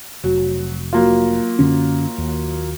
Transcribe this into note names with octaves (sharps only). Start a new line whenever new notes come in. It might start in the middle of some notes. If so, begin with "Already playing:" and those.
F1 F#3
F#3 A#3 F4
F#2 D3 C#4
D#2